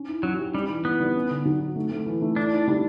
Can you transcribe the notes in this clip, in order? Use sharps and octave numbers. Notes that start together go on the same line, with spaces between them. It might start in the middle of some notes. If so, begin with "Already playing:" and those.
Already playing: C#4
E4
F#3 C#4
G4
G3 C#4
E3
E3 B3
G3
C#4
D3
F#3
F#4
A3
A3
E3
A3
D4 E4
E4
G3